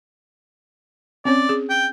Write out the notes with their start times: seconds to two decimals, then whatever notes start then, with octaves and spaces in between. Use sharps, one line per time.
1.25 C4 C#4 C#5 D5
1.49 G#4
1.70 G5